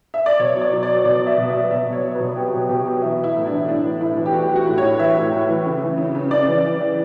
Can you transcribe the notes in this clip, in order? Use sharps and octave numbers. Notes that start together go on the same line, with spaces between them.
E5
D5
B2 C#5
F#3
D5
F#3
D5
F#3
B2 D5
F#3
E5
B2
E5
B2
B2 E5
B2
C#5
F#3
B2 B4
F#3 G4
B2
B2 G4
F#3
E3 E4
E3 E4
A2
E3 D4
A2 D4
E3
A2 E4
E3
G4
E3 F#4
E3
F#4
A2
C#5
A2
E3 E5
A2
A2
E3
C#3
E3
C#3
C#3
C#3 D5
E3
E3
E3